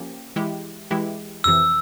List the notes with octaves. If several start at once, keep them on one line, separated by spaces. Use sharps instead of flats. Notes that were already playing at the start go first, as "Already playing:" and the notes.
Already playing: F3 A#3 C#4 G4
E3 G#3 E4 G4
E3 G#3 E4 G4
F2 C3 E3 E6